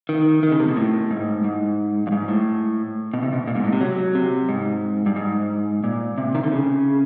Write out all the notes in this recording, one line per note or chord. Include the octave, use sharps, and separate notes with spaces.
D#3
D#3
C#3
C3
B2
A2
G#2
G#2
G2
G#2
A2
B2
C3
B2
A#2
G#2
A2
C3
F#3
C3
G#2
G2
G#2
A#2
C3
D#3
D3
C#3